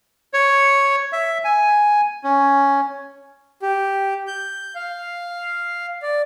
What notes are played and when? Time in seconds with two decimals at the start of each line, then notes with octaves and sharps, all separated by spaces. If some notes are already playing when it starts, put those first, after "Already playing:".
0.34 C#5
1.13 E5
1.44 G#5
2.24 C#4
3.62 G4
4.27 G6
4.75 F5
6.02 D5